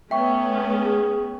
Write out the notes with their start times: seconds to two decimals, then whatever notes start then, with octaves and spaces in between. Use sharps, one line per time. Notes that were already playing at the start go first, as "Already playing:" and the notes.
0.11 A3 B3 C#4 E5 G5 C#6
0.82 G#4